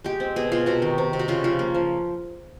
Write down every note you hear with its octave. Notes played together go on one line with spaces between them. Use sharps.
G#3 G4
C4
B2 G#4
B2 F4
C3 F#4
D#3
C3
C3
F#4
C#3 F4
F3 F4
A#3
F3